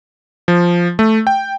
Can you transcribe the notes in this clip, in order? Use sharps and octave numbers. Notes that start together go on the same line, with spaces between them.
F3
A3
G5